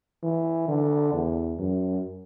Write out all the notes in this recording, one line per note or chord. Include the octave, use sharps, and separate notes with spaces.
E3
D3
E2
F#2